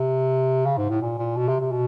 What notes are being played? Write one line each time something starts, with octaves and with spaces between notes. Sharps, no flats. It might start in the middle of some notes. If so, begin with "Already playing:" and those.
Already playing: C3
C#3
G#2
A2
A#2
A#2
B2
C3
C3
B2